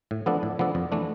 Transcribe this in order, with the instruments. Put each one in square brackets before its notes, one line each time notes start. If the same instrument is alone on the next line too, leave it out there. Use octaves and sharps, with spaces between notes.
[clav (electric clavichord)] A2
F3 B3 D4 A4
A2
F3 B3 D4 A4
F2
E3 A3 D4